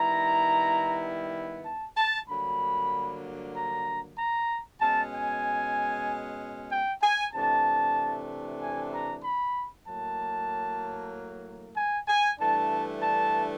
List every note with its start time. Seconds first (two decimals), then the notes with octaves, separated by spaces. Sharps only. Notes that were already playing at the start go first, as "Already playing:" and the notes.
Already playing: D#3 G3 B3 E4 A#5
1.65 A5
1.97 A5
2.28 G2 D3 F#3 A#3 B5
3.55 A#5
4.18 A#5
4.81 B2 G#3 C#4 A5
5.13 G#5
6.71 G5
7.02 G#5
7.34 C3 E3 A3 D4 A5
8.61 G#5
8.92 A#5
9.24 B5
9.86 A2 F#3 A#3 A5
11.76 G#5
12.08 G#5
12.39 G2 E3 A3 D4 A5
13.02 A5